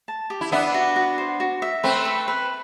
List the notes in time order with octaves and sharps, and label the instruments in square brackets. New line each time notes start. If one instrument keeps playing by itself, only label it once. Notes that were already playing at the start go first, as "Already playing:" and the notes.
[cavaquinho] A5
G4
[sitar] E4
[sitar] B3 D4 [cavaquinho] E5
[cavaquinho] F#4
F#4
C5
F#4
E5
[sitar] A3 C4 [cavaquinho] B4
[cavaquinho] B4
B4